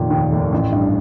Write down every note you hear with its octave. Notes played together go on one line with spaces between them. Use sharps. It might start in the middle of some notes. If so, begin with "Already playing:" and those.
Already playing: F1 A#2 D#3
D#2
F1
A1
G2